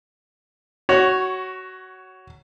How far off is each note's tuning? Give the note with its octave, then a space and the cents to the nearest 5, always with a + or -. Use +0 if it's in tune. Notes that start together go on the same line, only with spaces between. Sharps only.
F#4 +15 C#5 +0